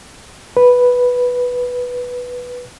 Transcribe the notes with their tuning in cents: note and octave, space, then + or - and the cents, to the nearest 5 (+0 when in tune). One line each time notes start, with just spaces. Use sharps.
B4 -5